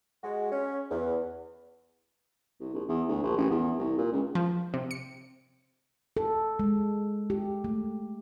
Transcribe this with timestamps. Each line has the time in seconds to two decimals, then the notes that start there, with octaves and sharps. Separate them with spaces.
0.24 G#3 F#4
0.52 C#4
0.91 E2
2.60 C2
2.75 A#1
2.89 E2
3.08 D2
3.23 A#1
3.36 A1
3.50 E2
3.78 C2
3.98 A#2
4.12 C#2
4.35 F3
4.74 C3
4.91 C#7
6.17 A4
6.59 G#3
7.30 G4
7.64 A3